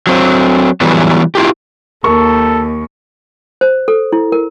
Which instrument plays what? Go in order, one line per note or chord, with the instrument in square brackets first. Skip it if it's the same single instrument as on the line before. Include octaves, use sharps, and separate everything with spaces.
[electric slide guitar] F#3 C4
E3 F#3 G3 B3
E4 F4 G4
[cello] D#2 [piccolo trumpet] A4 [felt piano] A#4 [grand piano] C#6
[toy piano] C5
A4
E4
A#4